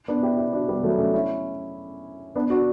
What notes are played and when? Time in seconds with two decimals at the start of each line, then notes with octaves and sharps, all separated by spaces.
0.08 B3 D4
0.23 E4 G4
0.37 E4 G4
0.53 D4 F#4
0.68 G3 B3
0.84 F#3 A3
0.99 A3 C#4
1.13 C#4 E4
2.35 B3 D4
2.50 D4 F#4